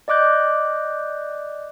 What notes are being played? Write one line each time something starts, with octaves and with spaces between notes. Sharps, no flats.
D5 D#5 D6 F#6 G6